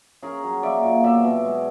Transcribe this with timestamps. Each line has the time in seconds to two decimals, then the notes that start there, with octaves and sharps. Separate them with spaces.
0.22 C#4 G#4 A#4
0.43 F#3
0.63 A#3 D5 E5
0.84 A#2
1.04 B2 D5 E5
1.24 B2
1.45 G#3